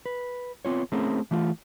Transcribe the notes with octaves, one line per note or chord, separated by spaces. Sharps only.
B4
B3 C4 F4 C#5
A3 C4 C#4 E4 G#4 A#4
E3 A3 F4